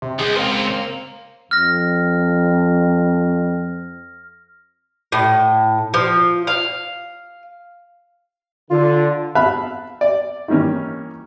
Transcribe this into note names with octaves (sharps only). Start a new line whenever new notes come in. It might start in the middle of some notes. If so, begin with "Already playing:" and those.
C3
C#2 G#3
C4 A#4 F5
F2 F6 A#6
A2
F3
F5
D3 F4
E5 F5 A5 B5 F#6
D5
D#3 E3 G3 A#3 C#4